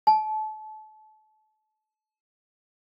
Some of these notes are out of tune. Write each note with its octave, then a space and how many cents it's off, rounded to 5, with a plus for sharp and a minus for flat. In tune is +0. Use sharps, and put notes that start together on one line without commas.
A5 -30